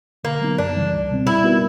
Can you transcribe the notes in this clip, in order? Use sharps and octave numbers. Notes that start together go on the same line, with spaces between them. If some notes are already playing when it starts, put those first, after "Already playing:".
D3 A#3
F#3 B3 D#4
F#2 D4
C#3 E3 G3
C#2
B2 G3 C4
G3 E4
B3 D#4 F#4 A#4